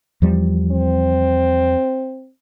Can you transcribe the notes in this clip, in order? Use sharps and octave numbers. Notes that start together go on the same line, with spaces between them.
E2 F3 G3
C4